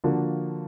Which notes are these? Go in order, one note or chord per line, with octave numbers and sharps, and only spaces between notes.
D3 F3 A#3 D4 F#4